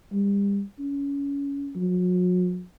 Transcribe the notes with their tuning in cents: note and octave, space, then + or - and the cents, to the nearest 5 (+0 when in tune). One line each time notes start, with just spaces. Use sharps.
G3 +35
C#4 +20
F#3 -40